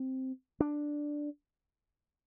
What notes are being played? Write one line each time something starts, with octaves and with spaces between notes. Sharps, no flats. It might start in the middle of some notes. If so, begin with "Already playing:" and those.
Already playing: C4
D4